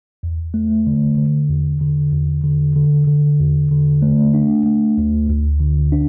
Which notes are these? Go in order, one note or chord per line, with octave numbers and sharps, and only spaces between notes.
E2
A3
D3
D3
E2
D3
E2
D3
D3
D3
E2
D3
A3
D4
A3
D2
D2
D3
D4